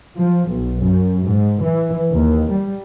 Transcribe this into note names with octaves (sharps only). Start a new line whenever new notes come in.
F3
B1
F#2
G#2
E3
D#2
G3